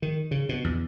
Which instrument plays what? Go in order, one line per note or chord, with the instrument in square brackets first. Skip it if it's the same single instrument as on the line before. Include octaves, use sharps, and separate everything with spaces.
[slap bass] D#3
C#3
B2
E2